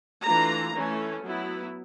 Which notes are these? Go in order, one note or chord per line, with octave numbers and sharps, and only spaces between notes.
E3 A3 D4 F4 A#5
E3 A3 C#4
F#3 B3 E4